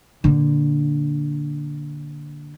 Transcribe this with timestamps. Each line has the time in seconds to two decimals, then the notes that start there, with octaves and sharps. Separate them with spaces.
0.24 A#2 D3